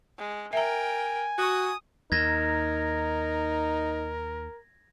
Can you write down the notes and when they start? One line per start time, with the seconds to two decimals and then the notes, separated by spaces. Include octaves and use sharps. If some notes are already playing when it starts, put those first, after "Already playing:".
0.18 G#3
0.53 A#4 E5 G5 G#5 A#5
1.39 F#4 D#6
2.12 D#2 D#4 A#4 G#6 A#6